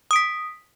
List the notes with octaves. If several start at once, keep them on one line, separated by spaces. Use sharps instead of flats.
D#6 B6 D7